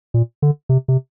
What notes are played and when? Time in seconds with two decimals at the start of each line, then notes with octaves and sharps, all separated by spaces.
0.14 A#2
0.42 D3
0.69 C3
0.88 C3